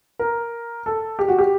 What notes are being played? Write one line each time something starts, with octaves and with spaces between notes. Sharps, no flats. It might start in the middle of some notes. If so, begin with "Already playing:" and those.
A#4
A4
G4
F#4
G4